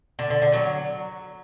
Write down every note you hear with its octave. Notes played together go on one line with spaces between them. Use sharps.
D3
D3
D3
F#3